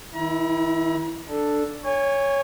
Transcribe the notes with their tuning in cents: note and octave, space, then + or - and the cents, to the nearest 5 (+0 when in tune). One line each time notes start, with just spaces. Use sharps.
D#3 +40 E4 +0 A#5 +40
D4 +5 A4 +0
C#5 +0 G#5 -30